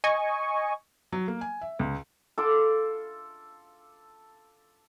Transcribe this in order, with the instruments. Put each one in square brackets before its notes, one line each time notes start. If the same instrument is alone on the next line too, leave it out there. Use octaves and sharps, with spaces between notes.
[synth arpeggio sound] D#5 G#5 C#6
[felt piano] F#3
A#3
G#5
E5
C#2
[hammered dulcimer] A4 F5 C6 D6